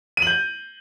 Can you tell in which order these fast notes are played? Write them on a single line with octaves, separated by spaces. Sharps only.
D#7 F#7 G6